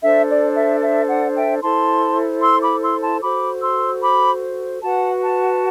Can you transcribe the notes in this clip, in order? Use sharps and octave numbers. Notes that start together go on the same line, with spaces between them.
D4 A4 C5 E5
D5
E5
E5
D5 F#5
E5 G5
E4 A4 C5 A5 C6
C6 E6
B5 D6
C6 E6
A5 C6
F#4 A4 C5 B5 D6
C6 E6
B5 D6
F#4 B4 F#5 A5
F#5 A5